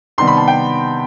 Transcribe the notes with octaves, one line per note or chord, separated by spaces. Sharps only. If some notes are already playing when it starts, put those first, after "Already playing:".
C3 D#3 G3 B3 C6
B5
A5
G5